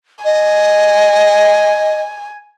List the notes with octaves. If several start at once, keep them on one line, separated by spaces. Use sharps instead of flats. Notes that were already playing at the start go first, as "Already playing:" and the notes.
D#5 G#5